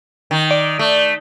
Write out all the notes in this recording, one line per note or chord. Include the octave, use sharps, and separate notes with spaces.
D#3
D5
A3